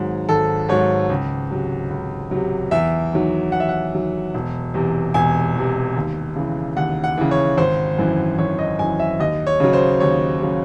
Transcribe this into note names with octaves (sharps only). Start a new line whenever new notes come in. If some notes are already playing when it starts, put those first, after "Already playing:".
Already playing: G#1 G#2 F#3
G#1 A4
G#2 F#3 C#5
C#2
C3 F#3
C#2
C3 F#3
E2 E5
D#3 F#3
E2 F#5
E5
F#5
D#3 F#3
E1
E2 C3
E1 G#5
E2 C3
D#2
C#3 E3
D#2 F#5
F#5
C#3 E3
C#5
G#1 C5
F#2 E3
G#1 C#5
D#5
F#2 E3 G#5
E5
D#2 D#5
C#5
C#3 F#3
C5
D#2 C#5
C#3 F#3